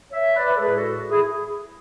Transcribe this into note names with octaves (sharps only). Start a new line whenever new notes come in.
C#5 E5
B4 D5
A4
A2 G#3 G#4 B4
F#4 A4
E4 G#4